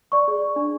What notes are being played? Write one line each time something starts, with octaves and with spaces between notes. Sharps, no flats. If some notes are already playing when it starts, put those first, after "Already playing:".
D5 C#6
G#4
D5
D4